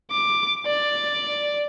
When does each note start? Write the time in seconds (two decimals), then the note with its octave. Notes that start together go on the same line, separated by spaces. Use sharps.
0.11 D6
0.66 D5